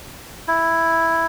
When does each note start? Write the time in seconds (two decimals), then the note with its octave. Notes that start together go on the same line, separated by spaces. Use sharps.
0.48 E4